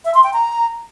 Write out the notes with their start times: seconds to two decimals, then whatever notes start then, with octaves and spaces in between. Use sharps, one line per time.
0.05 E5
0.14 C6
0.24 G5
0.33 A#5